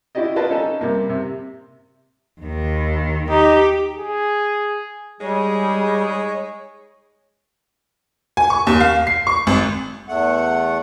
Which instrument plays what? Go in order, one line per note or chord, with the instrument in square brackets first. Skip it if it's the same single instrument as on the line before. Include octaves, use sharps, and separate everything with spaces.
[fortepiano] E4 F#4 G4 D5 D#5
F4 B4 D5 D#5 A5
C#4 D#4 A4
C3 G3 A#3
C3
[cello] D#2 D#3
[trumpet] D#4 [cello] G4
[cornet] G#4
[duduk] G3 [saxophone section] G#3 D#4 G#4 [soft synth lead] C#5
[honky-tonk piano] G#5
C#6
D#2
F5
C7
C#6
G#1
[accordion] E2 A3 F#5